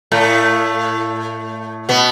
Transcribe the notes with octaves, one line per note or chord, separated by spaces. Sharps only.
A2 A3
B2 B3